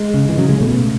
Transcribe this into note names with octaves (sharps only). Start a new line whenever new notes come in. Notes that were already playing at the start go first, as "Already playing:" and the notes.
Already playing: G#3
C#3
E3
C#3 F#3
G#3
B2 A3